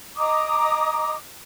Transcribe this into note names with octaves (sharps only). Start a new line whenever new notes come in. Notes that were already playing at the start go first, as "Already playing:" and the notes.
D#5 A#5 D6 D#6